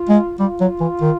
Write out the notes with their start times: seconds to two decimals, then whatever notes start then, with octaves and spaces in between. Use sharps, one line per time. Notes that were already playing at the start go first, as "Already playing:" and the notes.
Already playing: F4
0.09 G#3
0.39 G3 F4
0.61 F#3
0.81 E3
1.01 D#3